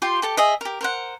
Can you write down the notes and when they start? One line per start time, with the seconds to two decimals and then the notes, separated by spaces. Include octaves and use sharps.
0.02 F4 G4 G5 C6
0.22 G4 A4 A5
0.37 G#4 D#5 E5
0.61 G4 A#4
0.81 A#4 C5 F#5